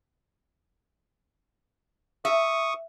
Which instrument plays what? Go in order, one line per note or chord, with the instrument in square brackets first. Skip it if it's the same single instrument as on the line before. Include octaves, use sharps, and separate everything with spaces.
[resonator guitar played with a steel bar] E5 [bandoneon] C#6 D#6